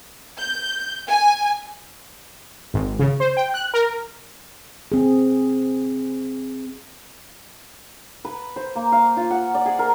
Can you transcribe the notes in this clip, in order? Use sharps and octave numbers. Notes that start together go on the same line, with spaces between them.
G6
G#5
G#1
C#3
C5
G5
F#6
A#4
C4 G#4
B4
C5
A#3
F5
F4
F#5
D5
G#4
A#4